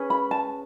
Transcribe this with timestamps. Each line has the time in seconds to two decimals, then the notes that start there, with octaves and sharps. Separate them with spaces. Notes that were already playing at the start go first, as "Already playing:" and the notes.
Already playing: C#4 G#4 B4
0.10 B5
0.31 A5